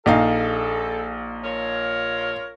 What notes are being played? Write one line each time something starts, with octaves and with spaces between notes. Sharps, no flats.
A#1 D#4 A4 F5
F4 A#4 C#5